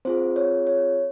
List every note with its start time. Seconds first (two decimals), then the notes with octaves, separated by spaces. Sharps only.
0.05 C4 F4 G#4 C5
0.36 C#5
0.67 C#5